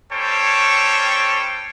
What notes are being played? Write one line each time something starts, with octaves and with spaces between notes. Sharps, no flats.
G3 C#4 A4 C5 C#5 G5